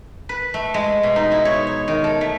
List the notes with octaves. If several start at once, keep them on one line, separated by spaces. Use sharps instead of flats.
B4
A3
G#3
B2
D#4
E4
C#5
C#5
D#3
A4
A3